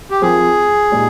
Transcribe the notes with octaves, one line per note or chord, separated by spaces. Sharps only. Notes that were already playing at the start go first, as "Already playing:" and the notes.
G4
F3 C4 F4 G#4 A#4
A#2 G#3 D#4 G4